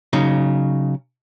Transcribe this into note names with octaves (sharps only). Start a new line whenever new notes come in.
C#3 F#3 D#4